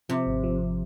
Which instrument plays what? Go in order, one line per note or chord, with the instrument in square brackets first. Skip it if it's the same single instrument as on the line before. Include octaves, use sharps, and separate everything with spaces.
[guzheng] C3 [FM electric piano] F3
[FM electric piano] G#1
F3